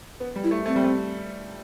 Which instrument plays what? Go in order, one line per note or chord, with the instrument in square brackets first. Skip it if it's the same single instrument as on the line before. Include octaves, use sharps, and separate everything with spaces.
[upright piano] B3
G3
[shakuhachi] E4
[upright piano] A3
[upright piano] A3 [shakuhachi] C4
[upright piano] G3
A3